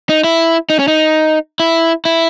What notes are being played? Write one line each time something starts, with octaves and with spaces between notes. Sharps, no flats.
D#4
E4
D#4
C#4
D#4
E4
E4